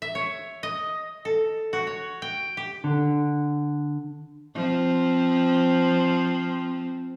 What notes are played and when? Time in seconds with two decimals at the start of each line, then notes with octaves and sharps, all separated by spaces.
0.02 E5
0.15 C#5
0.63 D#5
1.25 A4
1.73 F#4
1.87 C#5
2.22 G5
2.57 G4
2.84 D3
4.55 F3 C4